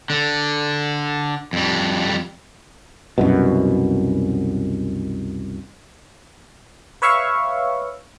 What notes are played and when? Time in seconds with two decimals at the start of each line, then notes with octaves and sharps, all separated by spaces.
0.10 D3
1.53 F2 G3
3.18 C2 F#2 B2
7.02 B4 C#5 E5 F5 C#6